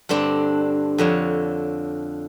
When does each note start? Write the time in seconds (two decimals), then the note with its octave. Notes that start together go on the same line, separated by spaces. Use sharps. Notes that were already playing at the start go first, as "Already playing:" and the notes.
0.09 G2 D3 C4 D4
0.98 F2 D3 C#5